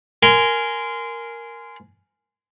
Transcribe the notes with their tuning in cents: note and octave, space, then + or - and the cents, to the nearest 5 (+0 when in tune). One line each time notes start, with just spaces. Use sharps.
A#4 +0 G#5 +5 C6 -25